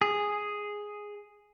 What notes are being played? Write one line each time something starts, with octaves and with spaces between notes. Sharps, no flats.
G#4